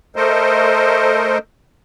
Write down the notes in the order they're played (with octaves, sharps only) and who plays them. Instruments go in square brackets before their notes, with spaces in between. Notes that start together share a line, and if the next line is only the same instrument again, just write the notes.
[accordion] A3 A4 A#4 C5 D#5